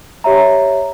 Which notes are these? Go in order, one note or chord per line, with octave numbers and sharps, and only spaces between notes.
G4 C#5 E5 A#5